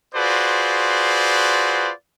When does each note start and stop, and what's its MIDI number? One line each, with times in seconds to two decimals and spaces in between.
0.15 1.92 65
0.15 1.92 66
0.15 1.92 68
0.15 1.92 71
0.15 1.92 72
0.15 1.92 74